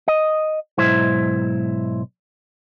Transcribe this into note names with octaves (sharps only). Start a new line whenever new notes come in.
D#5
B1 G#2 E4 C5